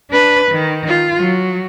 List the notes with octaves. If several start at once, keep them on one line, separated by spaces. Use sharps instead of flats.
D4 B4
D#3
F4
F#3